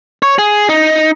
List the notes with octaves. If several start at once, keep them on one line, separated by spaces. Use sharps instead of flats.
C#5
G#4
D#4